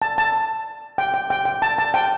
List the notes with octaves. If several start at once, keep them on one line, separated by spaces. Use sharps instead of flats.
A5
A5
G5
G5
G5
G5
A5
A5
G5